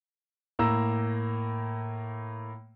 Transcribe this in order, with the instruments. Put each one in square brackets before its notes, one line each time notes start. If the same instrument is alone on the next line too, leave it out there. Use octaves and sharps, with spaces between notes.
[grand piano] A2 A#3 A#5 E6